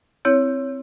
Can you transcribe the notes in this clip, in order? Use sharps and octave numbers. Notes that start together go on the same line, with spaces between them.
C4 E4 C#5 G6